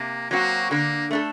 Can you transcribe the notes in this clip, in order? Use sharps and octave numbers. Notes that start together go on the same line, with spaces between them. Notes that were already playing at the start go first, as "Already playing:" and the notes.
Already playing: C3 A#3
F#3 A#3 C4 F#4
D3 A#3
A3 D4 A4